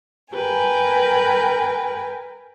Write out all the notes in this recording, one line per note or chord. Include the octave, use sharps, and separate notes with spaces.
A#4 B4 G5 G#5